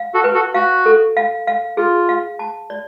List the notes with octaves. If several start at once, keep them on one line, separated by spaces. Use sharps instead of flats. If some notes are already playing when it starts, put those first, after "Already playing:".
Already playing: F5
F#4 A4
B4
F#4 A4
F#4 F5
A4
F5
F5
F4 G#4
F5
A5
D5